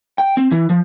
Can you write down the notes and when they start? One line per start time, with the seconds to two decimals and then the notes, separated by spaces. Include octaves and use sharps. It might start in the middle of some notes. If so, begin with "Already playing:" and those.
0.18 G5
0.37 C4
0.52 E3
0.70 F3